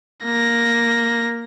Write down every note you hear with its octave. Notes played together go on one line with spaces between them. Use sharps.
A#3 A#6